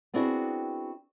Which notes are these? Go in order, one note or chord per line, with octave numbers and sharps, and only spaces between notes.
B3 C4 D4 E4 F#4 G#4